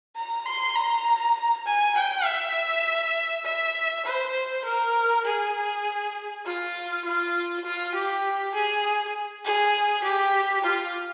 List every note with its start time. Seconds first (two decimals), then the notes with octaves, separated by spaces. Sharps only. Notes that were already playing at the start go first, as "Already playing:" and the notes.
0.16 A#5
0.46 C6
0.75 A#5
1.66 G#5
1.96 G5
2.26 E5
3.45 E5
4.05 C5
4.65 A#4
5.25 G#4
6.45 F4
7.05 F4
7.65 F4
7.95 G4
8.55 G#4
9.45 G#4
10.04 G4
10.64 F4